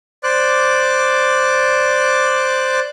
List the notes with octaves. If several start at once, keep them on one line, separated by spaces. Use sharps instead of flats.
C5 D5 D6 F#6